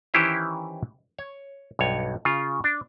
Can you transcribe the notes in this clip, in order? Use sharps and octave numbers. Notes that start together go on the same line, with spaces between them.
D#3 E3 C#4 E4 G4 C5
C#5
B1 G2 C#5
C#3 F4
D4